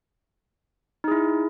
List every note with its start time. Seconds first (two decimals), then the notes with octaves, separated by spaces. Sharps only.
1.04 D#4
1.08 G#4
1.12 E4